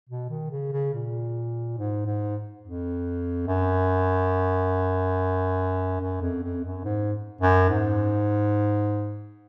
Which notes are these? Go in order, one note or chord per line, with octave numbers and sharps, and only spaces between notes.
B2
D#3
C#3
C#3
A#2
G#2
G#2
F2
F#2
F#2
F2
F2
F#2
G#2
F#2
G#2